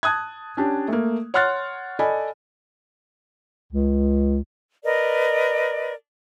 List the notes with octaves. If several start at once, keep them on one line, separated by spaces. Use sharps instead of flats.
A5 D#6 F#6 G#6
C#4 D4 G4
A3 A#3
C#5 F#5 C6 F6 F#6 A6
A4 D5 D#5 G#5 B5
C#2
A#4 B4 D5 D#5